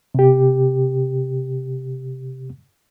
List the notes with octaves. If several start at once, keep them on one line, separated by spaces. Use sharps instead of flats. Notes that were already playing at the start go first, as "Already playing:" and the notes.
C3 G4